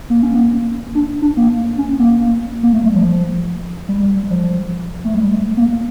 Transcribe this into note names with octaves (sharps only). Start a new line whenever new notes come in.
A#3
C#4
A#3
D4
D4
A#3
C#4
A#3
A#3
A3
G3
F3
G3
G3
F3
A3
G3
A3
A#3